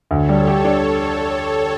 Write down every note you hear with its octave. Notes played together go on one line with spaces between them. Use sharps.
D2 A4 C#5
G3
G4
D4